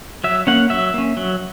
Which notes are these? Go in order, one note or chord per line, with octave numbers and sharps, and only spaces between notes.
F#3 E5
A#3 C#4 F#5
F#3 E5
A#3 C#4
F#3